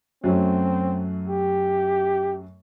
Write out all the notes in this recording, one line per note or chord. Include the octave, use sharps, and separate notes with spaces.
F#2 F#3 A3 C4
G4